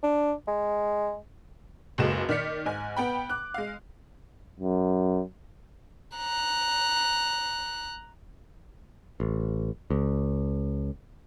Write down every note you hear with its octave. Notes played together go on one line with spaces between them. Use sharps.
D4
G#3
F#1 C#2 F#2 G#3 A4 E7
D#3 D5 F6 B6 C#7
G#2 G#5
B3 G5 B5
D6 F#6
G#3 F5
F#2
A#5 F#6
A1
C#2